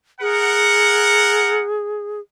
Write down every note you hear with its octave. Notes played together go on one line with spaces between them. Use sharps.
G#4 A#4 F#5